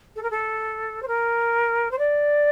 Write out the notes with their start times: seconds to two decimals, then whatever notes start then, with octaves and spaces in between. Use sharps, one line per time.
0.16 A4
0.23 A#4
0.31 A4
1.03 C5
1.08 A#4
1.91 C5
1.99 D5